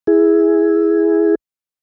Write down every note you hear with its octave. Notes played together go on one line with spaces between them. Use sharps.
E4 G#4